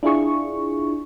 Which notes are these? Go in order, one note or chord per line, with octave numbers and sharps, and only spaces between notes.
D4 E4 F4 G#4 C#6